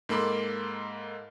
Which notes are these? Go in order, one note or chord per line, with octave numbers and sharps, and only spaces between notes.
G#2 A#3 A4 B5 C6 D6